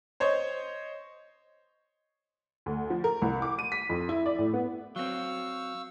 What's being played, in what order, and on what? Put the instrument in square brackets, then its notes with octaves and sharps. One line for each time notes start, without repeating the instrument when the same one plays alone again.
[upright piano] C5 C#5 D#5
[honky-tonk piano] D2
F3
A#4
C2
D6
D#7
B6
F2
E4
D5
A2
B3
[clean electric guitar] F#3 C4 [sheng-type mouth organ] F5 C#6 E6